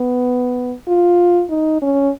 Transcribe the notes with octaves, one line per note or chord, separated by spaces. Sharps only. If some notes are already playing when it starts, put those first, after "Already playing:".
Already playing: B3
F4
D#4
C#4